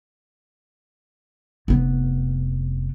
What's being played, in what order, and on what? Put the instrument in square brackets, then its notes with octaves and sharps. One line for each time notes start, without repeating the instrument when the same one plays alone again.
[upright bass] F1 B3